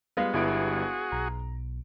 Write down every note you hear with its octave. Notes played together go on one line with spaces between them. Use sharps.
G3 G#3 B3 F4
G1 E4 F#4 G#4 D7
B1 A#5